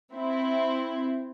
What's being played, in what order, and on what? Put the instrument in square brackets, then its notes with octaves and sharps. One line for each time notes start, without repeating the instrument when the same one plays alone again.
[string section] C4 E4